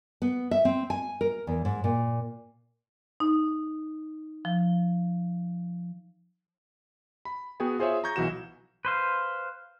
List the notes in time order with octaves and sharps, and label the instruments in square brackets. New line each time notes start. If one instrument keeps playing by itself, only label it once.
[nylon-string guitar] B3
E5
C4
G#5
A#4
E2
G#2
A#2
[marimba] D#4
F3
[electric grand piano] B5
B3 F#4 G#4 G5 G#5
F4 G#4 C5 C#5 E5
A#5 C#6 G6 G#6 A#6
B1 E3 F#4 E7
[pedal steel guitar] B4 C5 F5